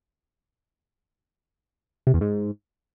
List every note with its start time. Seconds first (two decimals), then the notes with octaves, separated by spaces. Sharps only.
2.07 C3
2.14 E2
2.21 G#2